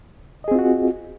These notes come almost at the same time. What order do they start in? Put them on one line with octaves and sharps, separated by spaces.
D#5 G#4 C4 F4 F#4